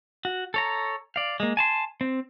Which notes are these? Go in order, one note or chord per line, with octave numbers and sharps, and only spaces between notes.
F#4
A4 C#5 A#5
D5 F5
G#3 A#3
G#5 A5 C6
C4